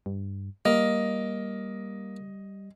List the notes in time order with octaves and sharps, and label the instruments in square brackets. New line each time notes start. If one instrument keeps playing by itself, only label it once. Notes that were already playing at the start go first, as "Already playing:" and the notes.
[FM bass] G2
[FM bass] G3 [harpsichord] A#3 [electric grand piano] D#5